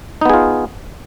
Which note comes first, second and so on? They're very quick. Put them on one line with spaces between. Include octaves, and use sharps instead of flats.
D#4 B3 G#4 F4